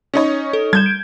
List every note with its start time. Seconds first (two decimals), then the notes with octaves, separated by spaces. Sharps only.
0.14 C#4 D#4 C#5
0.53 A4
0.73 G3 G6 G#6 E7
0.86 D7